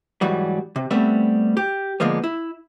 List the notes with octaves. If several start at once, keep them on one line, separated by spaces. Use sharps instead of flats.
G#2 E3 F#3 G3
C3
G3 A3 B3 C4 B4 E5
G4
D3 F3 G#3 A#3 B3
E4